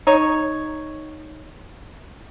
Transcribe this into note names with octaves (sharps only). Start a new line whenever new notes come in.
D#4 C#5